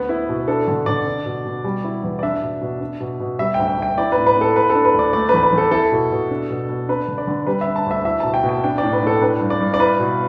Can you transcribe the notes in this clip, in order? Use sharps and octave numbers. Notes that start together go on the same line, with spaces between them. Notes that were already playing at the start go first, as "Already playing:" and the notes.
Already playing: D2 B3
E4
B2
D4 A4
D3
D3 D5
D4
B2
B2
G3
E4
E2
D5
D4 E5
B2
B2
D4
B2
B2
G3 E5
D2 G5
E5
D2 G5
E4 D5
A2 B4
B4
A2
A4
B3 B4
A4
D4
B4
D2 D5
A3 D5
E2 B4
B4
E2
A4
E4 A4
B2
B2
D4
B2
B2
D4 B4
D3
D5
D3
G3 B4
E5
D4
A5
D2 E5
E4 E5
B2 A5
G5
B2
G5
D4 G5
A2 D5
B4
A2 A4
D4 B4
G2
D5
G2
D5
E4 B4
B2